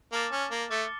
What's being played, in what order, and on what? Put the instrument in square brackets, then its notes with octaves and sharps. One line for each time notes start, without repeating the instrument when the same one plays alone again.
[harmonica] A#3 [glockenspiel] A5 D6 F6 A6 E7
[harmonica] C#4
A#3
[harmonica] A3 [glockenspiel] D6 A6 C#7 G7